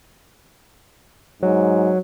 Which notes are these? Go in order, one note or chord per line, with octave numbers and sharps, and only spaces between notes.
G#2 F#3